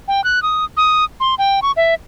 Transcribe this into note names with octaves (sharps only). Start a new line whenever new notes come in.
G5
F#6
D#6
D#6
C6
G5
C#6
E5